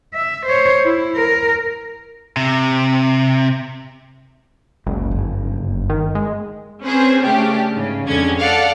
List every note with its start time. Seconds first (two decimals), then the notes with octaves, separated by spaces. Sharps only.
0.14 E5
0.46 C5 C#5
0.85 E4
1.15 A#4
2.37 C3
4.87 F#1 C#2
5.11 G1
5.90 D#3
6.15 G#3
6.84 C4 C#4 G#4 B4 C5
7.23 C#3 A3 C#4 D4 G4
7.73 G#2 C#3
8.08 F2 D3 G#3 C#4 G#6
8.40 A4 D5 F5 F#5